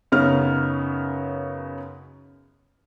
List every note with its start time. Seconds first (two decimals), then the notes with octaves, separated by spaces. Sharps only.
0.12 F#2 C#3 B3 D#4 F6